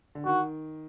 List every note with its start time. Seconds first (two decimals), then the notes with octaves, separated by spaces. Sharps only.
0.15 D3
0.25 D#3 F#4